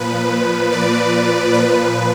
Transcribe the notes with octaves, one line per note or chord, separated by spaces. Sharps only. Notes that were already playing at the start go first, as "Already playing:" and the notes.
Already playing: A#2 F3 B4
D5
A#2 F3 B4